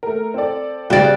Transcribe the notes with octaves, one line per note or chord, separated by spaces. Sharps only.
A3 A#4
C4 A4 D5
C#3 G3 F#4 G4 D5